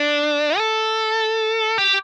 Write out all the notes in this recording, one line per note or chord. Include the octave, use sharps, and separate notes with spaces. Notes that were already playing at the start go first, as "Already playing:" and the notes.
Already playing: D4
A4
G4